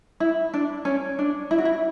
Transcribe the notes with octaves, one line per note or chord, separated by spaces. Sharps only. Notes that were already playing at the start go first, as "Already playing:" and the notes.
E4
D4
C#4
D4
E4
F#4
E4